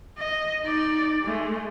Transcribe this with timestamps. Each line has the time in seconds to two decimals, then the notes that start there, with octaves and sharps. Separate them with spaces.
0.18 D#5
0.64 D#4 D5
1.23 G#3 A3